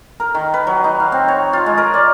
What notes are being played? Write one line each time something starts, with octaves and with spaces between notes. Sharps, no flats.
A#4
D#3
B4
F#3
D#4
F5
C4
C#5
F4
G#3
A#4
D5